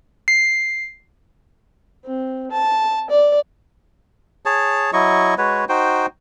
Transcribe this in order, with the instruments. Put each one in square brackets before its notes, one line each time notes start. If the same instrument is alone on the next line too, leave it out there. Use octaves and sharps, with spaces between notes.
[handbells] C7
[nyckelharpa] C4
A5
D5
[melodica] G#4 C#5 A5
F#3 E4 D#5 C#6
G#3 F#4 B4 C#5
D#4 F#4 C5 G5